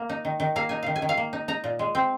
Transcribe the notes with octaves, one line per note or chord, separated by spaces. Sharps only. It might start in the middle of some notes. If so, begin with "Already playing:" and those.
Already playing: A#3
D#4
D#3
D#3
A#3 F5
D#4 G#5
D#3 F5
G#5
D#3
F5
A#3
D#4
D#4 A#5
A#2
G#3
C4